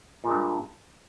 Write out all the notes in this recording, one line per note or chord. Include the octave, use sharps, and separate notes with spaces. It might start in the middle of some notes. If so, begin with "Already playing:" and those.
G2 A#2 G#3